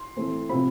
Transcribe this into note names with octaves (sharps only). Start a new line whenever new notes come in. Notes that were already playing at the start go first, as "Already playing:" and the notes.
Already playing: C6
E3 A3 C4
C3 F3 C4 B5